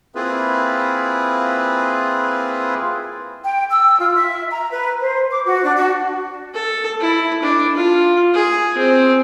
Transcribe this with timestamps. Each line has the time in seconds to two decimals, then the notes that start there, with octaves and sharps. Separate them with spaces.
0.15 A#3 C4 E4 F4 G#4 B4
3.43 G5
3.70 E6
3.99 F4
4.14 E5
4.50 A#5
4.72 B4
5.00 C5
5.29 D6
5.45 F#4
5.63 D4
5.75 F#4
6.54 A4
7.01 E4
7.43 D4
7.76 F4
8.34 G#4
8.78 C4